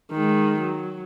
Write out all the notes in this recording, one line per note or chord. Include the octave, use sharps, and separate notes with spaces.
D#3 G#3
F#3